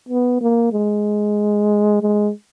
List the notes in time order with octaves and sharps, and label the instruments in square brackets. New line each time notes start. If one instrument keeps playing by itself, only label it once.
[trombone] B3
A#3
G#3
G#3